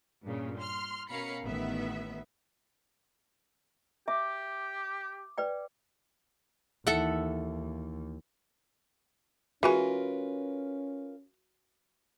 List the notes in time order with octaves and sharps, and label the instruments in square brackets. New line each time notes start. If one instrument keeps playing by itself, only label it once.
[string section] G2 A#2 C#3
C6 F6
B2 C#4 A#4 F5 B5 C#7
A1 D#3 B3 E5
[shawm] G4 [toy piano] E5 [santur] D6
[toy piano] B4 D5 G5
[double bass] D#2 [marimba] E3 D#4 E4 [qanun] A4 E5 F#5
[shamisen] E3 G#3 [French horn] C#4 [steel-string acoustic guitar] F4 A#4 B4 [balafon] F#4 G#5